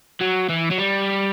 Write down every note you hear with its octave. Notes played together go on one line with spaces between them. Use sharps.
F#3
E3
F#3
G3